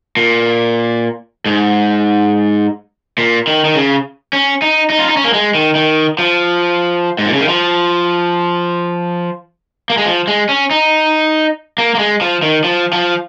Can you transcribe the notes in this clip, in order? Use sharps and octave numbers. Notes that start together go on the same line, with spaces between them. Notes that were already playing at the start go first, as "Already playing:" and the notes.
A#2
G#2
A#2
D#3
D#3
C#3
C#4
D#4
D#4
F4
D#4
C#4
A#3
G#3
D#3
D#3
F3
G#2
A#2
C#3
D#3
F3
A#3
G#3
F3
G#3
C#4
D#4
A#3
A#3
G#3
F3
D#3
F3
F3